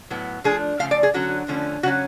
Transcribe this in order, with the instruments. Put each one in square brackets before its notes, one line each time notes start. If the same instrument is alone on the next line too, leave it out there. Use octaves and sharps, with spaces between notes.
[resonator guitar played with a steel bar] A2 F#3 B3
F3 A3 D4 G#4
C#3 F3 A3 F5
D5
G#4
D3 F#3 C#4 F#4
D3 F3 A3 C#4
C#3 F#3 C#4 F#4